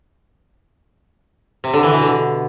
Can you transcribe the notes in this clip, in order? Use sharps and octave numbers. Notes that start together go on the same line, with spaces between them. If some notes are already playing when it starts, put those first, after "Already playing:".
C3
D3
E3
B2
D3